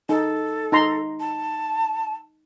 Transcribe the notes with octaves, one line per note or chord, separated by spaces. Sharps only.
D#4 A4
D#4 A#5 C6
A5